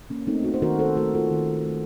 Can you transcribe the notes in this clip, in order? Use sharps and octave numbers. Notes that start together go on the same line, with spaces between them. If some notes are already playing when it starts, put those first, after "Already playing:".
A#3 C#4
A3 C4 D#4
D#4 F#4
C5
D#3 F#4 A#4
A4 C5
A3 F#4 A#4
F4 A4
D#3
A3